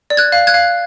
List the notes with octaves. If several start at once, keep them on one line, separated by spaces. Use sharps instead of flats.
D5
F#6 G#6
F5
F#6 G#6
F5